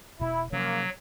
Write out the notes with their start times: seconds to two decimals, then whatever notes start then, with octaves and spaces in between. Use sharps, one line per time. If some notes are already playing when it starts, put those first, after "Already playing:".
0.20 E1 B2 E4
0.52 G#2 C3 F3 F#3 A#3 C#4